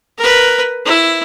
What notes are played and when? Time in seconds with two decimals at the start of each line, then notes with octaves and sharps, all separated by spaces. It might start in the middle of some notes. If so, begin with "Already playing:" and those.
0.19 A#4 B4
0.86 E4